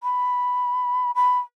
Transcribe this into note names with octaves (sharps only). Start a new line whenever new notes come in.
B5
B5